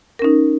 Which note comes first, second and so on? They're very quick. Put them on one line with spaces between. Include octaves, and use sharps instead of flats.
A#4 C#4 D#4